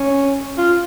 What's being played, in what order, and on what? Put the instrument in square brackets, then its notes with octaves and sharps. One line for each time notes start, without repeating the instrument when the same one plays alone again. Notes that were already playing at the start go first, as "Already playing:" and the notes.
Already playing: [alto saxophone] C#4
F4